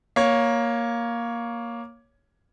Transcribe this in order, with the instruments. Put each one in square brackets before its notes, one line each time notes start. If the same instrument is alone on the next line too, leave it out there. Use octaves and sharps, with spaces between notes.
[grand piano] A#3 C#5